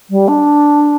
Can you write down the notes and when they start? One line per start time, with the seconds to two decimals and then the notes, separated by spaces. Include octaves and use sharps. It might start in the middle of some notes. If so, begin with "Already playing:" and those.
0.10 G3
0.28 D4